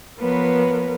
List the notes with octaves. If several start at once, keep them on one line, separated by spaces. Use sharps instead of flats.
F3 B3 A#4 B4 C#5